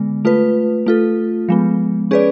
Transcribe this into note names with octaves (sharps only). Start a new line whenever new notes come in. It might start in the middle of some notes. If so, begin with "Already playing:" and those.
Already playing: D3 G#3 B3
A3 F4 B4
A3 F4 A4
F3 G#3 B3
C#4 G#4 B4 D5